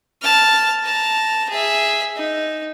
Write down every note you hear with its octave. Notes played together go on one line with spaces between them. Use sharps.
A5 F6
A5 A#5
G#4 E5
D#4